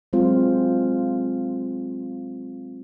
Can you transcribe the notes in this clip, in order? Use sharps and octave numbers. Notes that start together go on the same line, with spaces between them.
F#3 G#3 C4 F4 C5